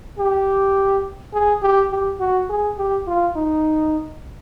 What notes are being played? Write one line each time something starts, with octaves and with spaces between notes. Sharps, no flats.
G4
G#4
G4
G4
F#4
G#4
G4
F4
D#4